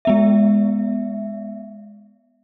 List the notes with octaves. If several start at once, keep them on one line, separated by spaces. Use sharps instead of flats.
G#3 B3 E5